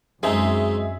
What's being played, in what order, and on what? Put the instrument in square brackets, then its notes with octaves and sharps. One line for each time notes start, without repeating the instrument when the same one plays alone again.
[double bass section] F#2 [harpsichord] G#3 C4 D#4 [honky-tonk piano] G#4 E5